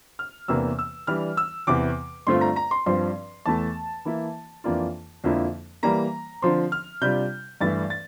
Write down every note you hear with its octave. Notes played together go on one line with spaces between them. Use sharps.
F6
E2 C3 E3 A#3 D4 E6
E6
E3 G3 D4 F6
E6
E2 C3 E3 D6
G2 D3 A3 C4 F4 C6
A#5
A#5
C6
G2 F3 C4 C6
E2 E3 A3 A5
E3 A#3 E4
F2 E3 A#3 D4 F4
F2 D3 F3 A#3 E4
E3 G3 A#3 A#5
D3 F3 C4 C6
F6
C3 G3 D4 F4 G6
G2 E3 A3 E4 A6
A6